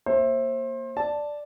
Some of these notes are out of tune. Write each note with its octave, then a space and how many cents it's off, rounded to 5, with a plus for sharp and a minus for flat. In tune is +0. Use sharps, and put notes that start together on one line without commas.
A#3 +0 C5 +30 E5 +0
D5 +0 A5 +0